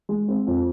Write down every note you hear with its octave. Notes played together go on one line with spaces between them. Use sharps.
G#3
C4
F2